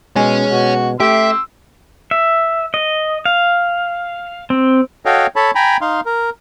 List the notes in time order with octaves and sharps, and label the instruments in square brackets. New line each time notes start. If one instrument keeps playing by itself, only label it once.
[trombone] B2 [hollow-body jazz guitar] G#3 C#4 G#4 [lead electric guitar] C#5 G#5
[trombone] B2 [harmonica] F#4
[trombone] A3 [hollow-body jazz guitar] G4 [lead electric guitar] E5 [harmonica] C6 E6
[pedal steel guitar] E5
D#5
F5
C4
[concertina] F#4 A4 C#5 D#5 F5 G5
A4 C#5 A5 B5
G5 G#5 A#5 B5
D#4 F5 C6
A#4